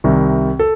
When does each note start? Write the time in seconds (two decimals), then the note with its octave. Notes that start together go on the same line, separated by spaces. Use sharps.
0.04 C2 C3 D#3
0.59 A4